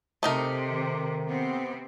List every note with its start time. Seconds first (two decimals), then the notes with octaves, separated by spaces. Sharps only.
0.23 C3 A3 D#4 A#4
0.68 D#3
1.26 C3 B3 C4